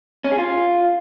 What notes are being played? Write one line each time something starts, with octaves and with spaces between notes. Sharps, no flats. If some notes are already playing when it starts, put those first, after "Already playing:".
C#4
G#4
F4